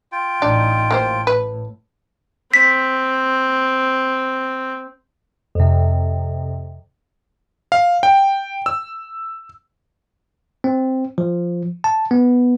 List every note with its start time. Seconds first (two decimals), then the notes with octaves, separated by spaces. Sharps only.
0.12 F4 G5
0.42 A1 D4 D#4 G4 D5
0.91 A2 A#3 G4 C5
1.27 B4
2.54 C4 B6
5.55 F2 C3
7.72 F5
8.03 G5
8.66 E6
10.64 C4
11.18 F3
11.84 A5
12.11 B3